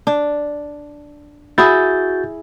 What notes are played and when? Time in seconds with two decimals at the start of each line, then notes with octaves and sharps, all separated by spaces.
0.07 D4
1.58 E4 F#4 G#4 G6 A6